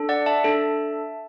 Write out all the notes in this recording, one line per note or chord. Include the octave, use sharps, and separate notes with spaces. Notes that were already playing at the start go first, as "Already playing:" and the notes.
Already playing: D4 A4
D5 F#5
E5 A5
D4 A4